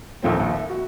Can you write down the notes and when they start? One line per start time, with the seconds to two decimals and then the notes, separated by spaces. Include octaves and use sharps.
0.23 A#1 D#2 F3 A3 C4
0.40 A#1 D#2
0.54 E5
0.70 F#4